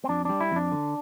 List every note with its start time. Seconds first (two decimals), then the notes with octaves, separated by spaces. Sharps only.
0.04 C4
0.09 F2 D4
0.25 G3 D4
0.40 E4
0.51 F2 D4
0.72 D3